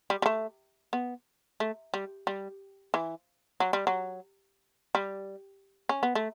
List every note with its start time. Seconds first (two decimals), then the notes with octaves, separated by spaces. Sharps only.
0.10 G3
0.22 G3
0.26 A3
0.93 B3
1.60 A3
1.94 G3
2.27 G3
2.94 E3
3.60 F#3
3.73 G3
3.87 F#3
4.95 G3
5.89 C#4
6.03 B3
6.15 A3